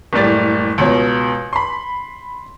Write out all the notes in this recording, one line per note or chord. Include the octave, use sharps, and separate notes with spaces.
F#1 A2 G3 A6
C#2 B2 C#5
B5 C6